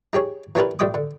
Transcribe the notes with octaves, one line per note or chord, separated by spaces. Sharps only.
D#4 G4 G#4 C#5
E3 C#4 D4 G4 A#4 B4
A1 G3 D#5 G5 D6 D#6
D3